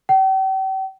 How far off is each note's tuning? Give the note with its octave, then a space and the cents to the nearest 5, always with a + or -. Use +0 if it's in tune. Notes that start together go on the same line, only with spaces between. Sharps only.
G5 -40